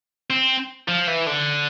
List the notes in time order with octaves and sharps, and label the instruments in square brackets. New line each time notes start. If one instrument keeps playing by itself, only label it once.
[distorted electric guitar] C4
F3
E3
D3